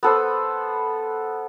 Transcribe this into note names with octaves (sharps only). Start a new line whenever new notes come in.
B3 A4 C5